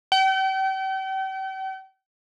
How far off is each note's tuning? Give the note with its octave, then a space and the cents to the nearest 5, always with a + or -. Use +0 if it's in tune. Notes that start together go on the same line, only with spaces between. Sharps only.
G5 -40